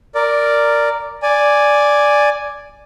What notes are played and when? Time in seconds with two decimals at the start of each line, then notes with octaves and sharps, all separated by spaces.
0.15 A#4 D5
1.23 D5 G#5